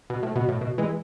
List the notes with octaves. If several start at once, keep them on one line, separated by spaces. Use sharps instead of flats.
B2
A2
B2
A2
B2
E3 G#3